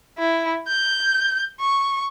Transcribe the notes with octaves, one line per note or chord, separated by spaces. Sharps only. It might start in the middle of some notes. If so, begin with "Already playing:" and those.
E4
G6
C#6